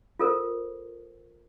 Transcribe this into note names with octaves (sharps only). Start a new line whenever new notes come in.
F4 A4 A#4 C5